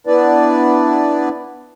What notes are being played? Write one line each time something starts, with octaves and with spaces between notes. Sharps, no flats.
B3 D4 E4 B4 D5